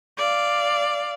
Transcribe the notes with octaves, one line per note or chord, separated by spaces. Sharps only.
D5 F5